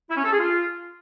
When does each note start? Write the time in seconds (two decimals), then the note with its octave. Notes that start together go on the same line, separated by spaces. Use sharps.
0.10 E4
0.17 C#4
0.24 A4
0.32 G#4
0.39 F4